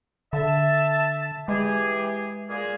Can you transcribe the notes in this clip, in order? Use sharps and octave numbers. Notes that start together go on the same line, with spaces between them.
D3 E5 A5
E3 G#3 G4 G#4
A#2 A#3 G#4